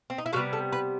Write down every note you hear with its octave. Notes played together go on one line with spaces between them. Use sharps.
C4
D#4
E4
C3 D#3 G3 B3 F#4
A4
B4